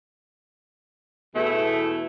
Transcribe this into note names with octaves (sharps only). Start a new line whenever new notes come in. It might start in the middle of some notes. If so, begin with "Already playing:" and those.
E2 B2 E3 A3 E4